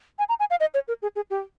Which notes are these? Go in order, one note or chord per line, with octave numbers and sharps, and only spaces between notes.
G#5
A#5
G#5
F5
D#5
C#5
A#4
G#4
G#4
G4